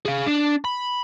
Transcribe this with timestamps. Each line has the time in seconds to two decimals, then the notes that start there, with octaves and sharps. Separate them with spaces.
0.05 G#4 F5
0.26 D4
0.65 B5